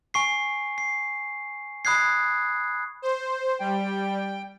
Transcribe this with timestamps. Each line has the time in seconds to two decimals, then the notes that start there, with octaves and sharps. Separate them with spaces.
0.14 G#5 C#6 C7
0.78 C7
1.85 B5 D#6 F#6 G#6 C7
3.02 C5
3.60 G3 G5